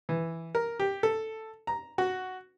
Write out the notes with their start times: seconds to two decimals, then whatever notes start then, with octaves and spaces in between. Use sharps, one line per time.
0.09 E3
0.55 A#4
0.80 G4
1.03 A4
1.67 A#5
1.98 F#4